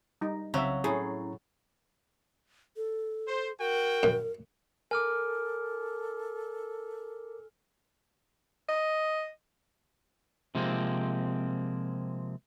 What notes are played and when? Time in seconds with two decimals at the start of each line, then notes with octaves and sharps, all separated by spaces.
0.21 G3 D#4
0.54 C2 C#3 F#3 C4 E5 F5
0.84 A2 C#4 E4 G#4 A#5
2.77 A4
3.27 C5
3.59 F#4 A#4 G5
4.03 F#2
4.91 A4 A#4 G#5 D6 F6
8.69 D#5
10.55 C3 F3 G#3 A#3 C4